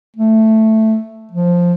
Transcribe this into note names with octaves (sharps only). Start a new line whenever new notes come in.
A3
F3